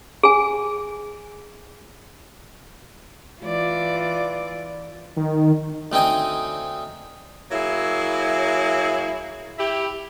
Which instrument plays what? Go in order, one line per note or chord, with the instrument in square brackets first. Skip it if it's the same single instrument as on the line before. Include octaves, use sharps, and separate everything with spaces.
[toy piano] G#4 G#5
[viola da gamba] E3 F4 D5
[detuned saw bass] D#3
[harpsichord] D2 C4 D#4 G5 G#5
[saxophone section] F#3 A#3 E4 G#4
E4 G4